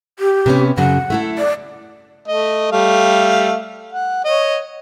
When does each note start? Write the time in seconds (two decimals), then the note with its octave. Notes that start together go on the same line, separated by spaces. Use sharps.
0.19 G4
0.46 C3 B3 C#4
0.77 F#2 C#3 F#3 F#5
1.10 A3 E4 A4
1.38 D5
2.28 A3 D#5
2.72 G3 A3 F5
3.93 F#5
4.25 C#5 D#5